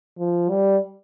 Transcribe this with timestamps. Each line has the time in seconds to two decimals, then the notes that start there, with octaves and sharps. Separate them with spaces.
0.18 F3
0.50 G3